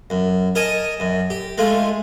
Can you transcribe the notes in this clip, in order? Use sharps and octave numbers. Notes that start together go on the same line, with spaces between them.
F#2
A#4 D#5 G#5 A5
F#2
G4
G#3 A3 F4